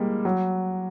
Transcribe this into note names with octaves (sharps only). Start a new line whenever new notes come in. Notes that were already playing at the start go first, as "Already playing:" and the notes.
Already playing: G3 G#3 A#3
F#3